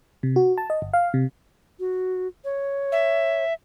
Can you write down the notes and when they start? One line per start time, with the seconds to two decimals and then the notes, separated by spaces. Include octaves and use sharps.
0.23 C3
0.36 F#4
0.58 A5
0.70 D#5
0.82 G1
0.93 F5
1.14 C3
1.80 F#4
2.44 C#5
2.92 E5